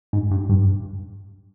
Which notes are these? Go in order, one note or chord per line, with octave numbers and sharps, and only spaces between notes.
G#2
G2
G2